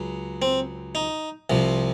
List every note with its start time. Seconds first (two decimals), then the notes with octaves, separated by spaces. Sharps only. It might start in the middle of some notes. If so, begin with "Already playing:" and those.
Already playing: C#2 C#3 F#3
0.42 C4
0.95 D#4
1.50 C2 C3 F3